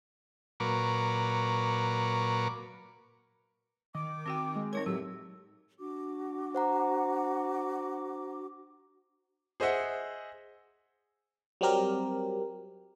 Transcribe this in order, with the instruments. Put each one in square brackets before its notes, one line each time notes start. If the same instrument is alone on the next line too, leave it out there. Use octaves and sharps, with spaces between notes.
[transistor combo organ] A#2 F#3 A#4 B4 C#6 D6
[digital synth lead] D#3 [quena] D6
[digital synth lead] D#3 [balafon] C4 F#4 G5
[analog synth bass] G#3
[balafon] C4 D#4 A#4 [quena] C#5 [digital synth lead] G#6
[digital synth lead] A2 [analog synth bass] F#3 [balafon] G4 [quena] E6
[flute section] D4 F#4 D6
[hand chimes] C5 F#5 A#5
[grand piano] G#4 C5 D#5 E5 F#5
[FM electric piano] F#3 G3 C4 G4 A#4